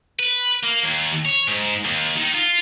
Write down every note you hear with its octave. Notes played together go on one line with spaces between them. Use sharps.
B4
A#3
D#2
C#5
G#2
D#2
D#3
F4